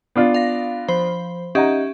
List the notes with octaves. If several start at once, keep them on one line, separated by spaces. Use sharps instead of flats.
B3 D4 F4
F5 A#6
F3 C5 B5
C#4 D#4 G4 E5 F#5 A#5